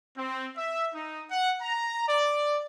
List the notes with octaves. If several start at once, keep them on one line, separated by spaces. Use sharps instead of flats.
C4
E5
D#4
F#5
A#5
D5